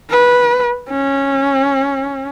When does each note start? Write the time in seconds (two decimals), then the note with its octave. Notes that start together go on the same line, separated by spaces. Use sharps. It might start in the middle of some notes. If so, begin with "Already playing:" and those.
0.10 B4
0.90 C#4